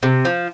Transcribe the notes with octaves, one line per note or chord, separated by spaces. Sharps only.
C3
F3